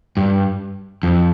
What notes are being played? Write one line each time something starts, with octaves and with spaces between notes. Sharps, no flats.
G2
F2